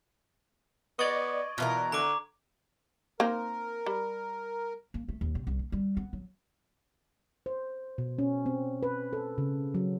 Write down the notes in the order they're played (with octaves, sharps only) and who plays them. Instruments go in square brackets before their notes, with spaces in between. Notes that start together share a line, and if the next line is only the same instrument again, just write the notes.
[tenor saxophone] B3 [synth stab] D5 D#5 [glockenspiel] C#6 G#6
[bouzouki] B2 E3 A#4 [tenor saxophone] F4
[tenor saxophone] D3 [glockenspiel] A#5 D6
[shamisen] A#3 C4 D#4 [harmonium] A#4
[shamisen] G3
[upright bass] A#3
A3
D#2
C3
C2
A#3
G3
B3
F#3
[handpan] C5
B2
C#4
C4
B4
A4
C#3
F#3